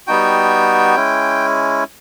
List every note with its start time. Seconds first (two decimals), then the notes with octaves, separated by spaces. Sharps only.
0.07 G3 B3 D#4 F#4 G5
0.96 G#3 C#4 E4